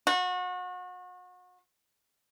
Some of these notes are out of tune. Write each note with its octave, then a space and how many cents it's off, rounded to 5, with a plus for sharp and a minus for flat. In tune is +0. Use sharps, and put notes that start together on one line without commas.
F#4 -35